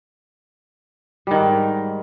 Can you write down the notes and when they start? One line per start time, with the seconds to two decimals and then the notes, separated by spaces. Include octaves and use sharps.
1.27 G3
1.31 D#3
1.35 G#2